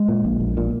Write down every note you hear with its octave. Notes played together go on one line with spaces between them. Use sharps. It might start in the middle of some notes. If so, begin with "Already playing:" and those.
Already playing: G#3
A#2
A#1
A#1
A#2